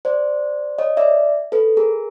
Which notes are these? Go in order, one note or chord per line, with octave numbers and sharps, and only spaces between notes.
C5 D5
C#5 D#5
D5 E5
A4 B4
G#4 A#4